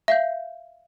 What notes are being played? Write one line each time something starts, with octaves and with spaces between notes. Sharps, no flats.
E5 F5 G6